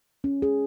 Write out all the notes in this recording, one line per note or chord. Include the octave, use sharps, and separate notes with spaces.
C#4
G#4